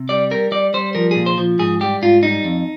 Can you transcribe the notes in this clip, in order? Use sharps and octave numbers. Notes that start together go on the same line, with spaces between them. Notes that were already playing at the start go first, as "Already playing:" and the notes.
Already playing: C3
G3 D5
G3 A#4
G3 D5
G3 C5
F3 A#4
A#2 G#4
C5
F3
G#2 G#4
G3 G4
G#2 F4
G3 D#4
F2